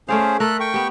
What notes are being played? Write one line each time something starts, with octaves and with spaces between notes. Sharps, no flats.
A3 C#4 G#4 C5 D5 F5
A3 A4 A#4 F#6
G5 C#6
B3 G4